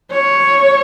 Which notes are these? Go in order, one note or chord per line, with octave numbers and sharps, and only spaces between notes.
C#5